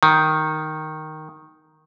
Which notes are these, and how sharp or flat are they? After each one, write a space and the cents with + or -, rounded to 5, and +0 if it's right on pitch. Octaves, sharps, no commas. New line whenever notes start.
D#3 +0